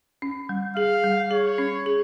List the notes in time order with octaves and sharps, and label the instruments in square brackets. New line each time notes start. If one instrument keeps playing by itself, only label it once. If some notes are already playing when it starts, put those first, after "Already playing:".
[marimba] C#4
G3
[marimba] G#4 [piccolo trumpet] F5
[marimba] G3
[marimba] G#4 [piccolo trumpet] C#5
[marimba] C#4
G#4